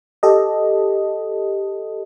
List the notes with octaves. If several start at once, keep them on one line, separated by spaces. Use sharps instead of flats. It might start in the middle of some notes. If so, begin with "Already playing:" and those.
G4 A4 D#5